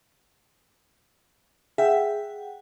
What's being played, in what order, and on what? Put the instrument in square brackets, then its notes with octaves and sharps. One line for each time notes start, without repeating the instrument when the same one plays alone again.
[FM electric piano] G#4 F#5 G5 [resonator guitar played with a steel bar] E5